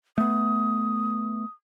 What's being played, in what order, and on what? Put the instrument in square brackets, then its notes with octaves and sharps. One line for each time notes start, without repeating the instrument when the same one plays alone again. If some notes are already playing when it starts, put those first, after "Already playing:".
[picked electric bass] A3 B3 [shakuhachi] D#6